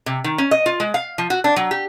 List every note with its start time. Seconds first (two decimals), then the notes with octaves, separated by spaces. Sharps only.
0.06 C3
0.24 D#3
0.38 C#4
0.51 D#5
0.66 F4
0.80 G#3
0.94 F5
1.18 F3
1.30 F#4
1.44 D4
1.56 F#3
1.71 G4